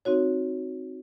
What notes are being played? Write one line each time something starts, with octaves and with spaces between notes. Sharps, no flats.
C4 D#4 F#4 C#5